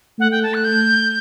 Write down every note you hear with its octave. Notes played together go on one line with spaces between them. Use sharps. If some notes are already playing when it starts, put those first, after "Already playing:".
A3 F#5
G5
A5
F#6
G6